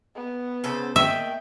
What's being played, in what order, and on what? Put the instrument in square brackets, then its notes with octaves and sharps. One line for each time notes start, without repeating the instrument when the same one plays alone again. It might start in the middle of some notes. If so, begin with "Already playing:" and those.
[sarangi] B3
[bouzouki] C#3 A4 C5
[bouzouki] A3 A#3 D#5 [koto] E5 [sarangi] G5